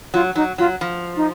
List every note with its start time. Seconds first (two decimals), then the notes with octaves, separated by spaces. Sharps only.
0.14 F#3 F4
0.36 F#3 D#4
0.58 F#3 F4
0.81 F3
1.17 D#4